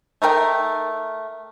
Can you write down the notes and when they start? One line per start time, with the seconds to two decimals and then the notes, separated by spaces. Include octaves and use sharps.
0.22 A3 D#4 A#4 G5